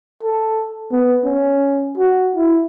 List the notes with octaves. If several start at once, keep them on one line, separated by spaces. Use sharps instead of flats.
A4
B3
C#4
F#4
E4